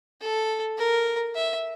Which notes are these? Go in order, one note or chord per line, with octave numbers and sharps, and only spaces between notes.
A4
A#4
E5